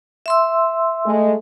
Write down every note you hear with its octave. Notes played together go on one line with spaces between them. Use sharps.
E5 C6 E6
G#3 A3